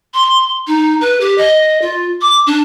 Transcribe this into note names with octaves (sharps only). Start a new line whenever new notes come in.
C6
D#4
B4
G4
D#5
F4
D6
D4